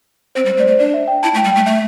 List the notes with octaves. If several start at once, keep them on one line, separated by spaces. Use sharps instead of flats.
C4 C5
G3
C5
A3
D5
C5
A3
D4 D5
E5
G5
E4 A5
A3
G5
G3
G5
A3
A3 E5